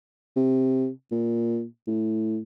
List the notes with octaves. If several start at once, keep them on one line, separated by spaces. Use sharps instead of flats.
C3
A#2
A2